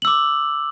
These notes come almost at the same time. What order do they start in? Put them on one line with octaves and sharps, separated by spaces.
F#7 E6 D6